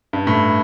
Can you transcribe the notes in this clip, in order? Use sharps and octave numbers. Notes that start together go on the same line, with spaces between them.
G2
A2